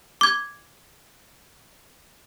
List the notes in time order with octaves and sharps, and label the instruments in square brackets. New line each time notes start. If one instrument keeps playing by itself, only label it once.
[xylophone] D6 G#6